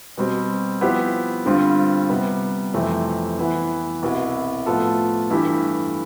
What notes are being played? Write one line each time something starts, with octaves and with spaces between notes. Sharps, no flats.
B2 G3 C4
F3 B3 E4 G4 C5
G2 D3 G3 C4 F4
C3 G3 B3
F2 C3 E3 A3 C4
E3 B3 E4
C2 B2 B3 E4
A2 F3 B3 F4 A4
G2 E3 A3 E4 G4